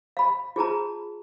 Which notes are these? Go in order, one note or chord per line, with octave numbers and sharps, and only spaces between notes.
F5 B5
F4 G#4 A5 A#5